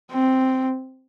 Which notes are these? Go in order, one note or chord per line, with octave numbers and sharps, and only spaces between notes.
C4